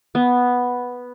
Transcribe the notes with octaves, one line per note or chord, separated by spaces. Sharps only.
B3